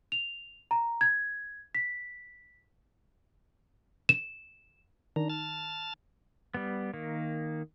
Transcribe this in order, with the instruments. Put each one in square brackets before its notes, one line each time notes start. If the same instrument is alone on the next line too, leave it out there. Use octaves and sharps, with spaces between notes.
[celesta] F7
A#5
G#6
B6
E7
[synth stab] D#3 [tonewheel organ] D4 A#5
[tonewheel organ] A5 F6 A6
[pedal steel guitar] G3 B3
D#3 A#3